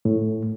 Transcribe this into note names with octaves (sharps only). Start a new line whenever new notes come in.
A2